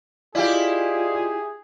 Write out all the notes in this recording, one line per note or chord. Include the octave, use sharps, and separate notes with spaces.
E4 F4 G4 G#4 D5 D#5 F5